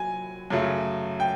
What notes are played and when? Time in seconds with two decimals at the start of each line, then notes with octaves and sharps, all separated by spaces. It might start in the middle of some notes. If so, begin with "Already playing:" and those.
Already playing: F#3 G#5
0.50 F#2 C#3 F#3 A3
1.20 G5